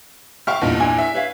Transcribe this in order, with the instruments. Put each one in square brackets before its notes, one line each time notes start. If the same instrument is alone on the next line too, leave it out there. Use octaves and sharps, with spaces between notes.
[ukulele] E5 G5 [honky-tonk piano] F5 C#6 F6
[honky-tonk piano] E2 G2 A#2 [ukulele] D#4
[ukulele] D4 E4 G#5
[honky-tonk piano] E5
[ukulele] B4 C#5 F5